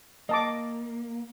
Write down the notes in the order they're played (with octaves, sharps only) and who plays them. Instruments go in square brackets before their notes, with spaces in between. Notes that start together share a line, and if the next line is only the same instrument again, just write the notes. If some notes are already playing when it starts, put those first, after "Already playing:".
[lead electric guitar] A#3 [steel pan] D#5 A5 D6